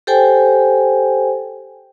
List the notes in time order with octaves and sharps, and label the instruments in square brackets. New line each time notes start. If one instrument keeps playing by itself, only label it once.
[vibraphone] G4 A4 C5 G5 G#5